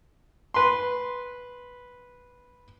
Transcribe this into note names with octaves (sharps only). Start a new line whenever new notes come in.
B4 C6